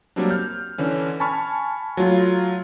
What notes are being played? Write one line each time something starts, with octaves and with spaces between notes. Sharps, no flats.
F#3 G3 A#3 C4 D4
F6 G6
D3 E3 C#4
G#5 A5 B5 C#6 F6
F#3 A3 F4